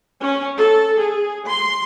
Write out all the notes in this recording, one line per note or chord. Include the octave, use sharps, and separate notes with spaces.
C#4
A4
G#4
C6